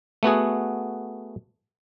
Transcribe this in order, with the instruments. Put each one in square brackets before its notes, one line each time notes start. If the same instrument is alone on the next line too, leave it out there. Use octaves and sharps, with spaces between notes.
[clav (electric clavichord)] A3 B3 F#4 G#4